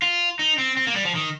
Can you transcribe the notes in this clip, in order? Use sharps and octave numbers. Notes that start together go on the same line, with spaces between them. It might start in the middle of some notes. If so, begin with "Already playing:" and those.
F4
D#4
C4
C4
A#3
G3
F3
D#3